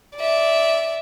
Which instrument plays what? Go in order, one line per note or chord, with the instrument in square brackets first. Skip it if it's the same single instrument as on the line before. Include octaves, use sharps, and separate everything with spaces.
[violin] D5 E5